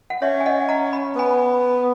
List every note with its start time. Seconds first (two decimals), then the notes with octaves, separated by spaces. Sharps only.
0.10 F#5
0.22 C#4 C#5 E5
0.41 G#5
0.46 D#5 F#5
0.69 F#5 A#5
0.93 B5
1.15 B3 G#5 B5